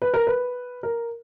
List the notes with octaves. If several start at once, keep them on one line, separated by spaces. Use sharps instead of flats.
B4
A#4
B4
A#4